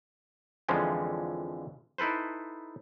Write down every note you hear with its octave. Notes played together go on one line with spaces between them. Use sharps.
F2 D3 E3 F3 G#3 C#4
D#4 E4 A4 B4 C5